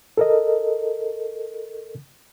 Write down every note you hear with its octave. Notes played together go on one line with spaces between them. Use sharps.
A4 A#4 D#5